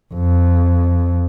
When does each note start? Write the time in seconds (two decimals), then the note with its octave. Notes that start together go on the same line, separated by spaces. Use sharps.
0.14 F2